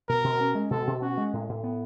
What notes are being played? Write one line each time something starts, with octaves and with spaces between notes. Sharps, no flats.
B2 A#4
B2
C#4
G#3
B2 A4
B2
C#4 F#4
G#3
A2
A2
B3